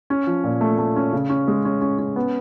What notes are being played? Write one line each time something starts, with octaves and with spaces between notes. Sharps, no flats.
C#4
F3
A#2
A3
A3
C#4
C#3
C#4
G#3
C#4
C#4
C#4
B3